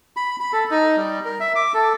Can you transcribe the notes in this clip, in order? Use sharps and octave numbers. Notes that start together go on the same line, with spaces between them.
B5
B5
A4
D#4
G3
A#4
E5
D6
A4